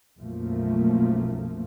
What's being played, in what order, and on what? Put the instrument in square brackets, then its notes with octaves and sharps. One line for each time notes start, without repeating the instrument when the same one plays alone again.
[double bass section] B1 F#2 F3 A3 A#3